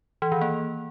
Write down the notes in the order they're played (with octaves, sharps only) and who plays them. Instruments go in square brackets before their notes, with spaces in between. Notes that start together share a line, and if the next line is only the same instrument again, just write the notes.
[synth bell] E3
D#3
A#3